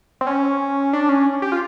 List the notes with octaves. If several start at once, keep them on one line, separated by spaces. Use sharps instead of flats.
C4
C#4
D4
C#4
G4
F4